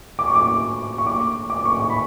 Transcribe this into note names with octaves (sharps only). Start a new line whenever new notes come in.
D6
C#6
D6
C#6
D6
D6
C#6
C#6
B5